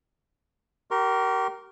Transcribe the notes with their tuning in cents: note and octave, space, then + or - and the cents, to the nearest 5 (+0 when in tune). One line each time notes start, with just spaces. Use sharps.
G4 -35 A#4 +0 C6 +40